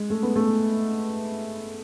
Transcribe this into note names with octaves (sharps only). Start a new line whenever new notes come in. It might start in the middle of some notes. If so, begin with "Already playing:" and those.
Already playing: G#3
A3
B3
A3